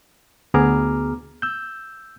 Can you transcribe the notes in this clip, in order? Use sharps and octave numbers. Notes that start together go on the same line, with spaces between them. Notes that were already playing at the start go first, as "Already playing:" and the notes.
D2 B3 G#4 A#5 D6 F6
E6 G6